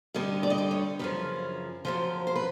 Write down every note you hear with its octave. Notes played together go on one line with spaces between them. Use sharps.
G2 D3 G3 D#5
D5
D#5
D5
C#5
F#2 C#3 F3 B4
F#2 C#3 F3 C5
C5
B4